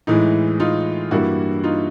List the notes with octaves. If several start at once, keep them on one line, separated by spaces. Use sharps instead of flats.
A2 E3 G#3 D#4
D#4 F4
G2 E3 G3 A#3 E4 F#4
D#4 F4